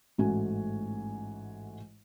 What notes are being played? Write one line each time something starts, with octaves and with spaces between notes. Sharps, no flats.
A1 G#2 A3 F#4 G#5